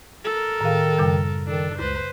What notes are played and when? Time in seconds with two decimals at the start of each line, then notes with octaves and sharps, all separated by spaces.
0.24 A4 A#4
0.61 A2 D#3 G#4 F5
0.98 F#2 C#3 G3
1.48 D#3 D4 A4
1.79 C#2 B4 C5